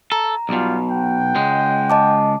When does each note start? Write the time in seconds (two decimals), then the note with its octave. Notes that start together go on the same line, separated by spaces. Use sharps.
0.12 A4 A#5
0.49 B1 B2 G3 F4
0.89 F#5 G5
1.35 C#2 G#3
1.90 D#5 A5 D6